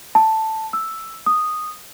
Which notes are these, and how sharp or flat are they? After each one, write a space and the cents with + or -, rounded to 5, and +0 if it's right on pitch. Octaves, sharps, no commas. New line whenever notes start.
A5 +5
E6 +0
D#6 -10